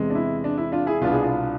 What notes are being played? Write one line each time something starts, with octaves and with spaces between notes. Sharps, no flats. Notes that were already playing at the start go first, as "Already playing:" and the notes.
Already playing: E2 C3 G#3
D4
E4
D4
E4
D4 F4
E4 G#4
C2 B2 B3 D4 F4
G#4
D4 F4